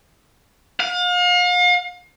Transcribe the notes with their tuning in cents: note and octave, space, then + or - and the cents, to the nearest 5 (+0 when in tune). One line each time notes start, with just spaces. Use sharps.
F5 +40